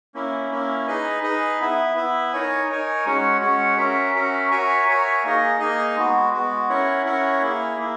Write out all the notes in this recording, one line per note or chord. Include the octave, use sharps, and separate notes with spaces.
A#3 C#4 E4
A#3 C#4 E4
D#4 G#4 B4 D#5
D#4 G#4 B4 D#5
B3 E4 B4 E5
B3 E4 B4 E5
D#4 A#4 C#5 G#5
D#4 A#4 C#5 G#5
G#3 C#4 F#4 C#5 F#5
G#3 C#4 F#4 C#5 F#5
C#4 F#4 A#4 E5
C#4 F#4 A#4 E5
F#4 A#4 C#5 E5 G#5
F#4 A#4 C#5 E5 G#5
A#3 D#4 G#4 D#5
A#3 D#4 G#4 D#5
G#3 B3 F#4
G#3 B3 F#4
C#4 E4 A#4 C#5 F#5
C#4 E4 A#4 C#5 F#5
A#3 E4 G#4
A#3 E4